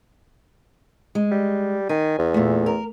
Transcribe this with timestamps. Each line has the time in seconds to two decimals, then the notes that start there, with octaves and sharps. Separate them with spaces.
1.15 G#3
1.31 G3
1.89 D#3 G#5
2.18 E2
2.34 A#2 A3
2.66 A#4